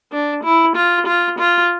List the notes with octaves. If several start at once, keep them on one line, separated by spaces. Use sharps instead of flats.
D4
E4
F4
F4
F4